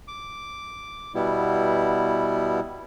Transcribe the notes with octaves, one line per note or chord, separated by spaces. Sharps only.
D6
B2 G3 B3 E4